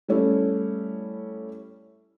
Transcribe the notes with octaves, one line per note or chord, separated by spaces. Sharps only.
G3 A3 C#4 E4